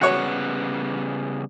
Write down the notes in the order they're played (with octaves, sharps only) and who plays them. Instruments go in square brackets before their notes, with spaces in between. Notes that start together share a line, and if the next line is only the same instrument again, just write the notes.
[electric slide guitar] C#3 G3 B3 [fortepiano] F#4 C#5